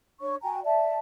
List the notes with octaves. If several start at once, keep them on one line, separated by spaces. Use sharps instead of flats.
D4 C#5 C#6
F#4 G5 G#5 A#5
D5 E5 A5